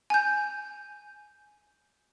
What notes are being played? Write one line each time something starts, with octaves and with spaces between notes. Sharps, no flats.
G#5 G6